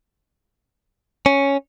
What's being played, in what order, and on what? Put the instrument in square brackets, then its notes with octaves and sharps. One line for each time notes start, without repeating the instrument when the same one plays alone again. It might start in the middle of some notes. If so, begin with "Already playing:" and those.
[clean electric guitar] C#4